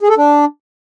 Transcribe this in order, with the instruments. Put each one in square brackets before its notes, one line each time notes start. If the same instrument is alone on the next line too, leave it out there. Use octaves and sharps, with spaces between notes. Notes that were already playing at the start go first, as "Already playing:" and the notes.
[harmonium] G#4
A4
D4